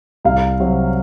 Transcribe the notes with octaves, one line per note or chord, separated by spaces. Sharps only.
C2 F5
C3 F#3